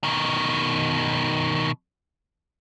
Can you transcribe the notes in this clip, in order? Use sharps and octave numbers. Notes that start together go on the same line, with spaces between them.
B2 D#3